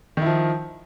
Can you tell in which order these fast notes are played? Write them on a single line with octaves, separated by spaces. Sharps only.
D#3 E4 F3